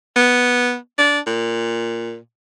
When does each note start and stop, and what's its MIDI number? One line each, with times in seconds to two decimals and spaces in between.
0.16 0.76 59
0.98 1.19 62
1.27 2.17 46